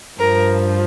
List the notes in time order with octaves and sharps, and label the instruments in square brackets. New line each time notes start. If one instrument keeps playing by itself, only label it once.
[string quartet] G2 F3 A#4